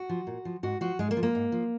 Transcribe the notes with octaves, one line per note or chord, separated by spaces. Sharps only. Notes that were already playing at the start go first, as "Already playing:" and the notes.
Already playing: F#4
F3
A#2
F3
G#2 F#4
F3 F#4
G#2 G#3
A#3
F3
A#3
G#2
F3